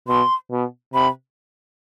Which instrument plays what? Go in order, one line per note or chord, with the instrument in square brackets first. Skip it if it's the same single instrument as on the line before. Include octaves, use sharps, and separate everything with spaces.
[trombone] B2 [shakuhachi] C6
[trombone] B2
[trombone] C3 [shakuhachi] B5